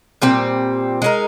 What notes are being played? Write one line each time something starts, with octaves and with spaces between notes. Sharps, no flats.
A#2 G3 C4
G#3 D#4 A#4